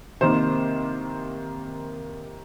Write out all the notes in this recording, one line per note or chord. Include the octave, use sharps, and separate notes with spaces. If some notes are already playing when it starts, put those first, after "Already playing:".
C3 D#3 A#3 C5